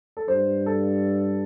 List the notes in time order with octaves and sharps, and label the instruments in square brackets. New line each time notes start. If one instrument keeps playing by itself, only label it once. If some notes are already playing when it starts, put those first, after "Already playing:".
[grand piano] A4
[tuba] G2 [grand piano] C5
[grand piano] A4